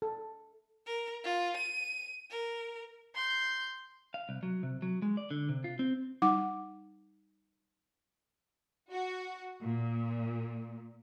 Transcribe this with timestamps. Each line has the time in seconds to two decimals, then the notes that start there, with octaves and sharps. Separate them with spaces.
0.02 A4
0.86 A#4
1.24 F4
1.56 D#7
2.30 A#4
3.16 C6 G6
4.14 F5
4.29 C2
4.43 F#3
4.63 C3
4.82 F#3
5.02 G#3
5.17 D5
5.31 D3
5.49 C3
5.64 F4
5.79 C4
6.22 G3 D#4 F#5 D6
8.91 F#4
9.62 A#2